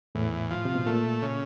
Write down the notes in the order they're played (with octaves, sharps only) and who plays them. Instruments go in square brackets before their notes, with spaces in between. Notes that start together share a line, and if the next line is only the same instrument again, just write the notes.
[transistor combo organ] E2 [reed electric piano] A2
[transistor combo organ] F3
[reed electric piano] C3
B2
[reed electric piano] A#2 [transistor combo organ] A3
[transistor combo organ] C#3